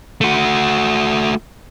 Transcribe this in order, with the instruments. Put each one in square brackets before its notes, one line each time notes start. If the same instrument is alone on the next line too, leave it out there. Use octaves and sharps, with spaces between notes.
[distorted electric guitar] A3 F#4